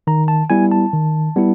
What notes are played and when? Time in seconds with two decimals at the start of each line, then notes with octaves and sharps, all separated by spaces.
0.07 D#3 A#5
0.28 A5
0.50 G3 B3 E4 G#5
0.72 A5
0.93 D#3
1.36 G3 B3 E4